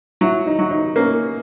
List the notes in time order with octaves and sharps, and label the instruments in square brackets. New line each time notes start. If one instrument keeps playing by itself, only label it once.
[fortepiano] F#3 [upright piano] E4
[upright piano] D#4
[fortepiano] F#3
[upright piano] D#4
[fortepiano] A#3 [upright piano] C#4